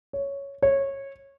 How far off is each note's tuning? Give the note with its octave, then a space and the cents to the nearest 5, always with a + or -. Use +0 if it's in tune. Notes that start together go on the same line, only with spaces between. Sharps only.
C#5 +5
C#5 -15